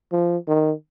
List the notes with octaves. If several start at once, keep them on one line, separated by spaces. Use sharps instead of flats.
F3
D#3